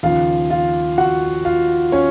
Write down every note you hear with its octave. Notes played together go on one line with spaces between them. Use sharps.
D#2 C#3 F3 F4 F5
F4 F5
F#4 F#5
F4 F5
C#4 C#5